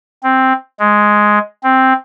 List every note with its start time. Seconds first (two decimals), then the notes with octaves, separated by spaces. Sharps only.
0.24 C4
0.80 G#3
1.64 C4